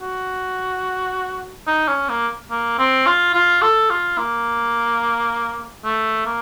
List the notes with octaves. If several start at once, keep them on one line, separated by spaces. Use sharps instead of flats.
F#4
D#4
C#4
A#3
A#3
C4
F4
F4
A4
F4
A#3
A3
A#3